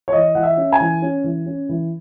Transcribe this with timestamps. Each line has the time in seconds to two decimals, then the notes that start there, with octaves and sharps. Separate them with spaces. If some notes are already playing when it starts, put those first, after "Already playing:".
0.08 C#5
0.13 E3 D#5
0.35 E3 F#5
0.43 E5
0.57 C#4
0.73 G#5
0.80 E3
1.02 C#4
1.24 E3
1.46 C#4
1.69 E3